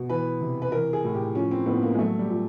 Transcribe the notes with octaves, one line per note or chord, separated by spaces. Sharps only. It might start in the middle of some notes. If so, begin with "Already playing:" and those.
Already playing: B2
E3 B4
C3
B4
E3 A#4
G#4
A2
G4
F3 C#4
C4
A2 B3
A#3
G#3
F#3 A3
G3
A#2